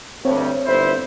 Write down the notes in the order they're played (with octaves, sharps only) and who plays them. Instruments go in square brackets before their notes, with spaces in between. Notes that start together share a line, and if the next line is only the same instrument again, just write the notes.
[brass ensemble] D2 G2 [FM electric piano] C4 C#5
[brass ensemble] G1 E4 C5